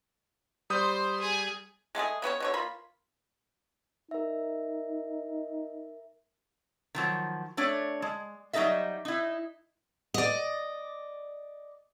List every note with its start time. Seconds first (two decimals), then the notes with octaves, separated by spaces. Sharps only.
0.70 G3 C5 C6 D#6 G6
1.21 G#4
1.95 G#3 A3 F#4 G#4
2.22 C#3 B3 F#4 C#5
2.40 B2 D3 C#5
2.54 A#3 F4 B5
4.11 D#4 A#4 E5
6.95 D#3 F3 F#3
7.57 A3 D4 C#5
8.02 G#3
8.53 F#3 G3 D#4 A4 D#5 E5
9.05 D#4 E4
10.14 D5 D#5